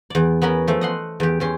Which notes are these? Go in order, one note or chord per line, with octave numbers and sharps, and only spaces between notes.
E2 D5
B3 C#4 A#4 B5
F3 A3
D#5 F#5 C6
E2 G4
E2 C#4 C6